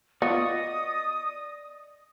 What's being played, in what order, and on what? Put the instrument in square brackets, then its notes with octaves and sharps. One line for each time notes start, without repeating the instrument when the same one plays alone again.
[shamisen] B3 F4 [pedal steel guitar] D5 D#5 C#6 [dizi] D#6